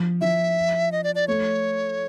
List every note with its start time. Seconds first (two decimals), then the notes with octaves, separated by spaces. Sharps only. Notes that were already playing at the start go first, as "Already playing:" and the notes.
Already playing: F3
0.21 F3 E5
0.92 D#5
1.04 D5
1.15 D5
1.28 A3 C#5